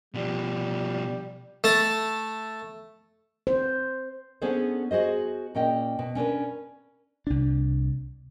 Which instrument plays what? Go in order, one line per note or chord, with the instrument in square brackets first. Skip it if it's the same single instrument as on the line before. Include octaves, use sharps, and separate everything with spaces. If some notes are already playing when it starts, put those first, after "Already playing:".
[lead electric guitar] B2 F3 [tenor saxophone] G3
[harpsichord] A3 A5
[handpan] C5
[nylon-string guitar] B3 C#4 D4 G#4 A4 C5
F#4 G#4 C5 D#5
A#2 C#4 D#5 G5
B2
C#4 D4 A#4 B4
[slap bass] C2 D4